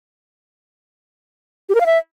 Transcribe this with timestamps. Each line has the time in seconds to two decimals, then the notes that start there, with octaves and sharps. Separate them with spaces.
1.69 G4
1.75 A#4
1.81 F5
1.86 E5